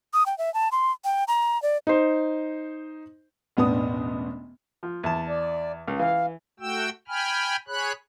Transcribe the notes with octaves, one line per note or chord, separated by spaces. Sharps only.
D#6
G5
E5
A5
C6
G5
A#5
D5
D#4 C5
E1 A1 B3 D4 D#6
F3
E2 A5
D5
C#2
E3 F5
A3 F#4 G5 E6
G5 G#5 B5 F6
G#4 C#5 B5 F#6